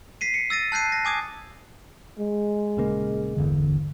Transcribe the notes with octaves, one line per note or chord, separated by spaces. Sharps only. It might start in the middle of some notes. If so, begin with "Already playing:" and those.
B6 C7 D#7
C#7
E6 A6 A#6 D#7
A5 F#6 G6 C7 D#7
A#6
G#5 D6 D#6 G#6
G#3
D#1 C#3 A#3
D1 G1 E2 D3